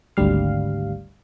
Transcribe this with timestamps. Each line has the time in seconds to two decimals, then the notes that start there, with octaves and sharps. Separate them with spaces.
0.17 G#1 D2 G3 F5